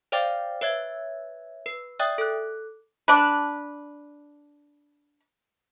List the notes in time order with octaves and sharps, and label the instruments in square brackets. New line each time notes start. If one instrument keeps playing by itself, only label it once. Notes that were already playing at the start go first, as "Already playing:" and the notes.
[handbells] C5 D5 F5 G5 D6 A6
B4 C#5 E5 G#6
B4
D5 E5 G5 D#6 F#6 A6
A4 F#6
[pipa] D4 B4